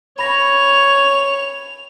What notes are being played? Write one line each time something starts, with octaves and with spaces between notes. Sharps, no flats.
C#5 B5 A#6 F7